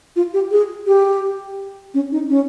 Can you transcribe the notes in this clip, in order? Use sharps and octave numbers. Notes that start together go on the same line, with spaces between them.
F4
G4
G#4
G4
C#4
D#4
C#4